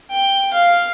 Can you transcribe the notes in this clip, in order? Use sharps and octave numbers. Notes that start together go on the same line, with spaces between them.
G5
F5